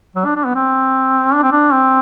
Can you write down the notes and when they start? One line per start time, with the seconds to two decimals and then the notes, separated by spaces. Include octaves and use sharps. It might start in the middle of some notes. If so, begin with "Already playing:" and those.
0.16 F#3
0.25 D4
0.36 D4
0.45 B3
0.55 C4
1.34 D4
1.43 C4
1.52 D4
1.73 C4